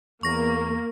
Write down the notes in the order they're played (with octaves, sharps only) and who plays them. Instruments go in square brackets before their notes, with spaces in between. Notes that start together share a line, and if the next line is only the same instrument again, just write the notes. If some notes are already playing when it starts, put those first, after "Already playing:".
[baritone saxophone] E2 [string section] A#3 [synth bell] C#6 A#6